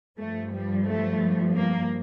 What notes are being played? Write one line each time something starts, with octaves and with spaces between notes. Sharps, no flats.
G2 F3 A3
G3
A3
A#3